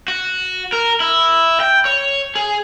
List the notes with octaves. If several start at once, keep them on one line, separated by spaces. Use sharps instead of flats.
F#4
A#4
E4
G5
C#5
G#4